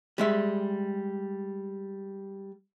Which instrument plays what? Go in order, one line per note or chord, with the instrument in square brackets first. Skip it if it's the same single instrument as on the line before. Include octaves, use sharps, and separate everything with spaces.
[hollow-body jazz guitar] G3 G#3 E5